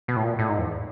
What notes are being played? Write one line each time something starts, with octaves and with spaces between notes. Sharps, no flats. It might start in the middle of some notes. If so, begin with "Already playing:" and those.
B2
A2
A#2
A2
G#2
E2